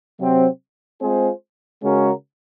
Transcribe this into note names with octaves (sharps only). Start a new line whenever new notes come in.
C3 F#3 C4
G#3 C4 F4 G#4 C5
C#3 G#3 C#4 F#4 A#4